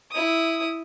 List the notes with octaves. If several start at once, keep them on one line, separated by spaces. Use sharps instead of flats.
E4 D#6